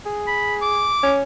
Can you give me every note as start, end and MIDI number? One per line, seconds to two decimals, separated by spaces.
0.06 0.94 68
0.27 0.56 83
0.62 1.15 86
1.03 1.23 61